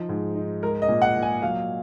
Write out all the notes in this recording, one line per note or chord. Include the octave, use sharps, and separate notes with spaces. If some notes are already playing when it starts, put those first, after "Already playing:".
Already playing: F3 D#4
G#2
D#4
G#3 A#4
D#5
A#2
F#5
A#2
G#5
F#3 F5